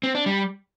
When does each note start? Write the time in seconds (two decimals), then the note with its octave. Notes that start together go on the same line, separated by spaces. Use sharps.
0.03 C4
0.15 D4
0.26 G3